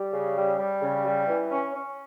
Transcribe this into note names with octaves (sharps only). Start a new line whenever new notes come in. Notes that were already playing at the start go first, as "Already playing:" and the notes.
Already playing: G3
C#3
G3
G3
C#3
G3
E3
C#4
C#4